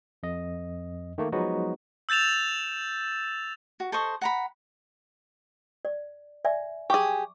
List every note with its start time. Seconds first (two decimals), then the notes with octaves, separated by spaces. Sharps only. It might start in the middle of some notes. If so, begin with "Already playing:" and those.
0.23 F2 D#5
1.18 D#3 A3 A#3
1.32 F3 F#3 G#3 B3 D#4 F#4
2.09 E6 G6 A6 E7 F7
3.80 F#4
3.92 A4 C5 D#5 C#6
4.21 F#5 A#5 B5
5.85 D5
6.45 D5 E5 G#5
6.90 G4 G#4 C#6 D6